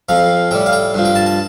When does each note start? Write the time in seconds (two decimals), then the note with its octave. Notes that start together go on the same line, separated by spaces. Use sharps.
0.09 F2 F3 F5
0.51 A2 G3 G5
0.66 F5
0.73 G5
0.94 G2 F3
1.05 G5
1.15 A5
1.26 A5